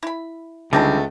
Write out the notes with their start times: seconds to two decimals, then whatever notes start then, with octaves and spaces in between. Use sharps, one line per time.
0.03 E4 B5
0.73 C#2 D3 G3 A3 C4 D#4 A4